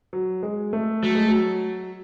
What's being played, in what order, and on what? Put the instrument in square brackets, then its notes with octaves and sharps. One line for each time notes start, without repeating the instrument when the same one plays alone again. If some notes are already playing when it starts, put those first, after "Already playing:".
[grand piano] F#3
G#3
A3
[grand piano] F#3 [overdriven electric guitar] A3
[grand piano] G#3
F#3